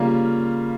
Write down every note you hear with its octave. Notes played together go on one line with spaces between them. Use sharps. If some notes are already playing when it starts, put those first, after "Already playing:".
Already playing: C#3 G3 A#3 F4